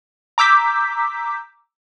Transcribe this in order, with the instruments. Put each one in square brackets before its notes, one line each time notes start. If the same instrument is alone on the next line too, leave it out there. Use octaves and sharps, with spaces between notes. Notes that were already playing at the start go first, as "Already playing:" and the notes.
[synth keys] A#5 D6 E6 G6 B6